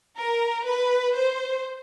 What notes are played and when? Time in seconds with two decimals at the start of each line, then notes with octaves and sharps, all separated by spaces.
0.18 A#4
0.67 B4
1.16 C5